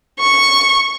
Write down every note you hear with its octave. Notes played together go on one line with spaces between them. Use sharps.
C#6